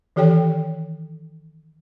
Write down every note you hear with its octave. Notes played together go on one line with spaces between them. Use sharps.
D#3 E3 G4 A4 C#5 G5